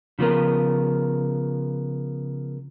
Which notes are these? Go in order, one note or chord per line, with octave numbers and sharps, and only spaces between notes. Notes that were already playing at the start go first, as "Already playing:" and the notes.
C#3 F3 B3 A#4